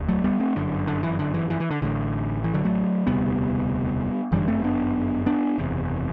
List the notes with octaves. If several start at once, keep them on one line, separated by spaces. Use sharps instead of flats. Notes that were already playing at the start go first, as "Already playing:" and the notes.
Already playing: E1 D2
F#3 A3
G3 B3
A3 C4
G1 F#2 D3
D3
E3
D3
E3
E3
E3
D3
A1 A2 D3
E3
D3 F#3
F#3 A3
E1 D2 C3 G3 B3
G1 F#2 D3 E3 G3
A3 C4
B3 D4
B3 D4
F#1 E2 C3